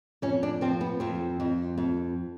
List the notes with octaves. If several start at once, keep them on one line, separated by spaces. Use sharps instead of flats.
F2 C#4
D4
F3 C4
B3
F2 C4
F2
F2